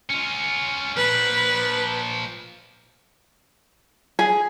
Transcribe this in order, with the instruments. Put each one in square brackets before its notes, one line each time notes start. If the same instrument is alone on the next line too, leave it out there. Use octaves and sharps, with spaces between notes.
[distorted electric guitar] C#4 F4
[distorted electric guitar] A#2 F3 [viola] B4
[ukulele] G#4